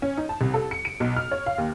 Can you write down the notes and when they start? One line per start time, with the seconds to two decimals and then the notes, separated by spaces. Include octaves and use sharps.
0.02 C#4
0.17 D#4
0.29 A5
0.41 C2
0.54 A4
0.71 C#7
0.85 D7
1.00 B1
1.17 F6
1.31 C#5
1.46 F5
1.58 D#2